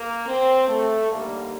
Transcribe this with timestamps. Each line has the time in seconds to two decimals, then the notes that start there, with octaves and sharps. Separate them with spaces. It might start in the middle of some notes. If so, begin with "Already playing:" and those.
Already playing: A#3
0.26 C4
0.68 A3
1.09 D#2 D3 G3 A#3